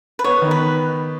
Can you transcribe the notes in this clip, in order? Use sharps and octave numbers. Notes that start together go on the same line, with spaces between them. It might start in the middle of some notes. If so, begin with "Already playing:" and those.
B4
B3 C#5
D#3
B4